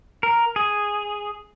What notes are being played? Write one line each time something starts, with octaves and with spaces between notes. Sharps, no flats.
A#4
G#4